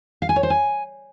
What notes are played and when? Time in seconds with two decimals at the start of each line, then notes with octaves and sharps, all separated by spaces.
0.22 F5
0.29 G#5
0.36 C#5
0.43 C5
0.50 G#5